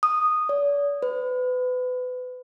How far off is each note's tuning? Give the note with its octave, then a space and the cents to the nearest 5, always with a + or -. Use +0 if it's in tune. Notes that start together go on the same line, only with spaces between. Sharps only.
D#6 -10
D5 -45
B4 +30